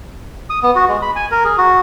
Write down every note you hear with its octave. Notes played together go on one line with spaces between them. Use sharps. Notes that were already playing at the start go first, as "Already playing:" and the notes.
D#6
B3
F#4
G#3
B5
G#5
A#4
G#4
F#4